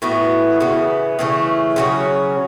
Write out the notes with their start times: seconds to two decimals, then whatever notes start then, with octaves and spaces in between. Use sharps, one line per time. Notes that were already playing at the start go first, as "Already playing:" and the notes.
0.02 A2 E3 B3 F#4
0.60 C#3 E3 B3
1.19 C#3 E3 A3
1.76 C#3 F#3 C#4 G#4